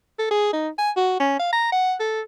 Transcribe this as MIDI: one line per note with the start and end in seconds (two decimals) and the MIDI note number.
0.19 0.26 69
0.31 0.52 68
0.53 0.69 63
0.78 0.90 80
0.97 1.15 66
1.20 1.35 61
1.39 1.49 77
1.52 1.70 82
1.72 1.95 78
2.00 2.21 69